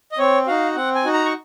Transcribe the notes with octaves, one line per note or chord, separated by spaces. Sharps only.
D#5
C4 C#5
D#4 F#4 F5
C4 F#5
G#5
D#4 F#4
A#5
C#6